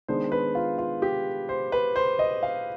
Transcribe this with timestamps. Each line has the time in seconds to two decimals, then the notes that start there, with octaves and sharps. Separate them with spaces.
0.08 D#3 G#3 B3 D4 C5
0.32 B4
0.55 F4
0.78 F4
1.02 G4
1.49 C5
1.72 B4
1.96 C5
2.19 D#5
2.43 F5